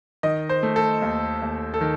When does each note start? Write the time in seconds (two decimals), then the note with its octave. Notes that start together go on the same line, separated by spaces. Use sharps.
0.23 D#3 D#5
0.49 C5
0.63 A3
0.76 A4
1.02 D#2
1.42 D#2
1.74 A4
1.81 D#3